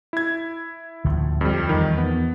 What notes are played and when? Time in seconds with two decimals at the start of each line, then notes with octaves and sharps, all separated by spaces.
0.13 E4 G#6
1.04 D2 A2 F3
1.41 F2 G3
1.69 E2 D#3 F3
1.98 B3